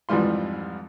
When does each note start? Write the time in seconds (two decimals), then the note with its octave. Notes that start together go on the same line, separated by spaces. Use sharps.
0.09 F2 G#2 E3 G3 F4 C6